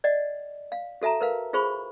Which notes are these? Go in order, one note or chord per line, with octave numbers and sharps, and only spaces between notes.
D5 D#5 F#5
F5
F#4 A4 E5 A5 A#5
A#4 B4 F5
F4 G#4 C5 B5 C#6